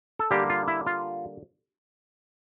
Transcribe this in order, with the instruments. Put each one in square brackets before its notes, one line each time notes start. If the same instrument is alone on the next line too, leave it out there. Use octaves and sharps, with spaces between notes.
[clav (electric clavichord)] A4
D3 G3 A#3 G4
F4
E4
F4